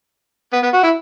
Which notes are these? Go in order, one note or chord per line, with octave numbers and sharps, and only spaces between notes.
B3
B3
F#4
E4